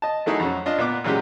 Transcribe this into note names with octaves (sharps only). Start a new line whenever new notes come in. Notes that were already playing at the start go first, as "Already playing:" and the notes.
D#5 A5
F#3 A3 D#4 E4 G#4
F2 F#3 C#4
D4 F4 D#5
A#2 B3 D6
A#2 E3 F#3 G#3 C#4 G4